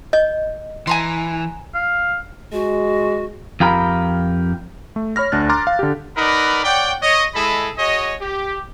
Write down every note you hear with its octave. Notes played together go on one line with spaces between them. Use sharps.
D#5 G6
E3 G#5 A#5 C6
F5
G#3 F#4
F2 F4 G4 A#4 B5
A3
C#5 B5 F6 A#6
D2 D4 F#6 A6
A#5 C6 D6 F6 A6
F5
D3 G4
D#4 A#4 B4 D5 F#5 B5
C#5 D5 F#5 G5
C#5 D#5
G#3 E4 G#4 A4 D#5 B5
F#4 G#4 C#5 D#5
G4